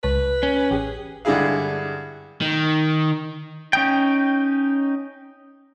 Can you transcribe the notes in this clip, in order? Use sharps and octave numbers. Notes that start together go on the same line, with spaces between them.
C#2 B4 C#5 A5
C#4
A1 G4 G#4
G2 D3 G#3 E4 G#4 F5
D#3
C#4 D#4 G5